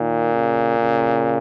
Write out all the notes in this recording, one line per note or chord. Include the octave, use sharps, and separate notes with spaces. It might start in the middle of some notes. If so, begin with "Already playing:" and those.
Already playing: A#2 D#3
C#3
C#3